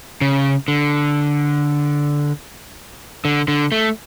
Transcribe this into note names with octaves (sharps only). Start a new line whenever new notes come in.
C#3
D3
D3
D3
A3